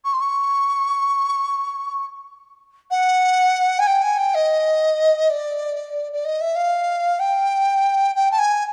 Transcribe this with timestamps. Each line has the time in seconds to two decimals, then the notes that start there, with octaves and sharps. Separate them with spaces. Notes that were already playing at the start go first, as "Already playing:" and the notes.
0.04 C#6
0.13 C6
0.21 C#6
2.90 F#5
3.79 G#5
3.87 G5
4.02 G#5
4.18 G5
4.34 D#5
5.29 D5
6.12 D5
6.24 D#5
6.41 E5
6.55 F5
7.19 G5
8.15 G5
8.31 A5
8.38 G#5